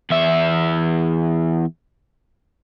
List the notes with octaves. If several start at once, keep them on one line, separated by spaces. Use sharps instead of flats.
E2 E5